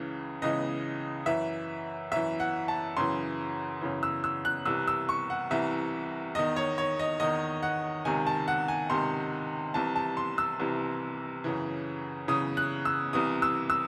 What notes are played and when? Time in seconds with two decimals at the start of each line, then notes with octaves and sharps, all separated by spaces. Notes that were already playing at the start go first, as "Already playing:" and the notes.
Already playing: C#2 C#3 E3
0.42 C#2 C#3 E3 D#5
1.26 F#2 E3 E5
2.11 F#2 E3 E5
2.40 F#5
2.68 A5
2.97 F#2 C#3 E3 C6
3.81 F#2 C#3 E3
4.03 E6
4.24 E6
4.45 F#6
4.66 C2 C3 E3 E6
4.88 E6
5.09 C#6
5.30 F#5
5.50 C2 C3 E3 E5
6.35 E2 D#3 D#5
6.56 C#5
6.78 C#5
6.99 D#5
7.20 E2 D#3 D#5
7.63 F#5
8.05 C#2 C3 D#3 G#5
8.27 A5
8.48 F#5
8.68 G#5
8.89 C#2 C3 D#3 C6
9.74 C2 C3 E3 A5
9.96 A5
10.17 C6
10.38 E6
10.60 C2 C3 E3
11.44 F#2 C#3 E3
12.28 F#2 C#3 E3 D#6
12.57 F#6
12.85 E6
13.13 C2 C3 E3 D#6
13.42 E6
13.70 E6